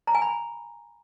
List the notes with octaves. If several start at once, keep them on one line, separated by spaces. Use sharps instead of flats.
A#5
G#5
B5